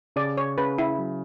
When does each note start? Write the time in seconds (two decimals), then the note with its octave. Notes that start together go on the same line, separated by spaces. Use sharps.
0.16 C#3 D5
0.37 C#5
0.58 C#3 B4
0.78 E4
0.99 F#3